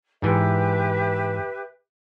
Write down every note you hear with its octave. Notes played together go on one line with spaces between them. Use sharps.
G#2 E3 G4 B4 E5